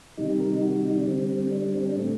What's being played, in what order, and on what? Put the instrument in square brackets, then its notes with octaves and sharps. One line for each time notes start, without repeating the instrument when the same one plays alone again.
[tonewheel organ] C3 D#3 G3 D#4
G4
A#4
D#4
F#4
F#4
D#4
D4
D3 G3 C4
C4
D4
D4
C4
D4
A2 A3 C4